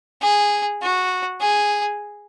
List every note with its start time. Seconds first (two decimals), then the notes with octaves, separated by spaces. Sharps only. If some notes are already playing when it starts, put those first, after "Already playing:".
0.22 G#4
0.81 F#4
1.41 G#4